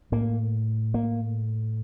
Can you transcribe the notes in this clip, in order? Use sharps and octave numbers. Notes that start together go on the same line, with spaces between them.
A2 A#3
A#3